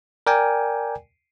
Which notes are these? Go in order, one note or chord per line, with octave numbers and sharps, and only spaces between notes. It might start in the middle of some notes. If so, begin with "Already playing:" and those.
A#4 D5 G5 G#5